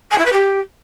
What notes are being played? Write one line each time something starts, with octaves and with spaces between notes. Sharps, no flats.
G#5
E4
B4
G4